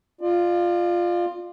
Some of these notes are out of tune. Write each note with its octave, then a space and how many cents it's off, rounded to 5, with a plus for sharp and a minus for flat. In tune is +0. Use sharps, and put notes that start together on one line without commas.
F4 +0 D5 +40